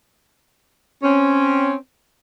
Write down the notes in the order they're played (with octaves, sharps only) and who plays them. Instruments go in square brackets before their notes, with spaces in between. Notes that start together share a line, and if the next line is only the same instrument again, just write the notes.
[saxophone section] C4 C#4